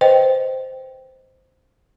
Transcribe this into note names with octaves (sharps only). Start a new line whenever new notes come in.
B4 C5 D#5 G5